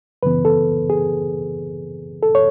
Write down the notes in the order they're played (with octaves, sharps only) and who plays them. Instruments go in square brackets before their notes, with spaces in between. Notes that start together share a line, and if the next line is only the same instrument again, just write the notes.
[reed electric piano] F#2 C#3 E3 B3 B4
A4
G#4
A4
C#5